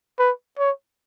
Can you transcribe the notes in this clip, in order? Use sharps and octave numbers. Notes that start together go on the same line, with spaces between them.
B4
C#5